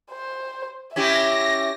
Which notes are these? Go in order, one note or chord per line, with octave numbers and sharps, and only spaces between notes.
C5
C#4 E4 G4 E5 A#6